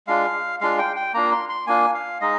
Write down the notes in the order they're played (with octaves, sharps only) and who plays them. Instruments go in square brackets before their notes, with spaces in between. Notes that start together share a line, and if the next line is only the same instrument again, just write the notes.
[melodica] G#3 D4 F4 F5
G#3 D4 F4 F5
G5
G5
A#3 D4 F4 A#5
C6
C6
A#3 D4 F4 G#5
F5
G#3 D#4 D#5